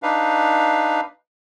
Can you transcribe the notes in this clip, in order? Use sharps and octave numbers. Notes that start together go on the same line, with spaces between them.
D4 D#4 B4 F5